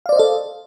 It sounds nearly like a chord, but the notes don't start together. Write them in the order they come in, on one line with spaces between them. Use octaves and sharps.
F5 D5 C5 D#5 A4